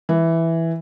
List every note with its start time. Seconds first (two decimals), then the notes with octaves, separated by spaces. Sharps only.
0.09 E3